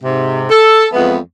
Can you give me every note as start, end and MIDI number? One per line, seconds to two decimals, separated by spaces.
0.02 0.45 44
0.02 0.45 48
0.50 0.85 69
0.93 1.17 41
0.93 1.17 52
0.93 1.17 56
0.93 1.17 59